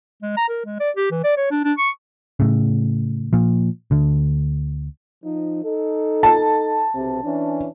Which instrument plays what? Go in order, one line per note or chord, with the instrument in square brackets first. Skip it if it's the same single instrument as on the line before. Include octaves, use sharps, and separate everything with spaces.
[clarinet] G#3
A#5
A#4
G#3
D5
G4
E3
D5
C#5
D4
D4
C#6
[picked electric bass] A2 C#3
A#2 F3
D2 D3
[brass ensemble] F3 D#4
D#4 A4
[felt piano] A5
[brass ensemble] B1 C3
E3 C#4 D4